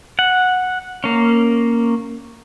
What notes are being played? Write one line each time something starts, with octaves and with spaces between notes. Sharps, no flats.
F#5
A#3 C#4